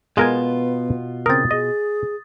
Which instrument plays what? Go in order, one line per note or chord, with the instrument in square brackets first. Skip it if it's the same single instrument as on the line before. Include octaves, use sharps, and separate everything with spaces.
[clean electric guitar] B2 F4 [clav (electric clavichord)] G#3 A#4 G#5 [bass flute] B3
[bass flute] C#3 [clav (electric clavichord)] C4 A#4 [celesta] D#6 A6
[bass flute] G#4 [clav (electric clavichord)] D#5